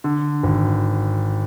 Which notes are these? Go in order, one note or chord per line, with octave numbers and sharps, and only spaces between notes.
D3
G#1